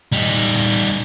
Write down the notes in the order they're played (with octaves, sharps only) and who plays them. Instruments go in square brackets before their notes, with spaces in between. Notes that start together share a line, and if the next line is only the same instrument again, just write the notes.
[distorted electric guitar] G3 D#4